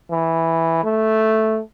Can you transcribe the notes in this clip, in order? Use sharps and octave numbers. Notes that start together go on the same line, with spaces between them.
E3
A3